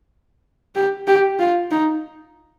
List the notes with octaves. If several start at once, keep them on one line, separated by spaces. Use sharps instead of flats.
G4
G4
F4
D#4